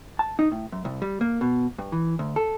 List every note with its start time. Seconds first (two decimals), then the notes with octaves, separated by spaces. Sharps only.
0.19 A5
0.39 D#4
0.52 A2
0.72 F#2
0.85 C2
1.02 G3
1.21 A#3
1.41 B2
1.79 G2
1.92 E3
2.19 D2
2.36 A4